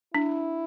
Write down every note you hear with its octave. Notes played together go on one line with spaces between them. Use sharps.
D4 E4